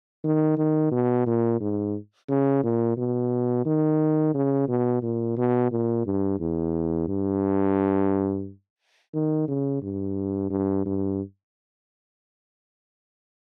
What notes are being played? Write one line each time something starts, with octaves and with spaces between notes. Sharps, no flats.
D#3
D#3
B2
A#2
G#2
C#3
A#2
B2
D#3
C#3
B2
A#2
B2
A#2
G2
E2
G2
D#3
C#3
G2
G2
G2